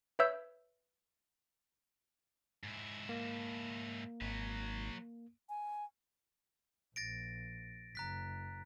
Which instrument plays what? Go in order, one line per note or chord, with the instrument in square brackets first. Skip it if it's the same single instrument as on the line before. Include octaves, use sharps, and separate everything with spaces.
[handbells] B4 C#5 E5 E6 G6
[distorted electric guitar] G#2 E4
[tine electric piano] A#3
[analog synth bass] G#1 [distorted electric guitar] F#3 B4
[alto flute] G#5
[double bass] A#1 [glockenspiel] A6 A#6 D7
[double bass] F#1 [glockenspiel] A#5 F#6 B6